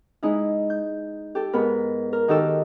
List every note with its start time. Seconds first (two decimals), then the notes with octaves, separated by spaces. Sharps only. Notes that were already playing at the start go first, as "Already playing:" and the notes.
0.23 G#3 D#4 E4
0.70 G6
1.35 G4 A4
1.53 G#2 B3 A#4 B5
2.13 A#4
2.28 D#3 D#4 F#4 G4 A4 E6